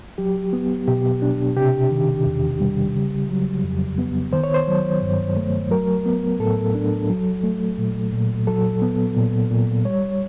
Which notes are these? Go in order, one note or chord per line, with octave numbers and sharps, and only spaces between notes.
F#3 G4
B3
B2 G4
D4
C3 G4
D#3
E2
G3
C#3
F#3
F2
B3
D#3 C5
C#5
C5
F#3
G2
A3
F#3 A#4
B3
A2 A4
D4
F#3
A3
A#2
A#2
F#3 A4
B3
A#2
A#2
G3 C#5